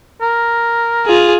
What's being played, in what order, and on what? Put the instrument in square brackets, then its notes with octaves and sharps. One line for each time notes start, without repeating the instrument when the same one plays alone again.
[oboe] A#4
[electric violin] F4 G#4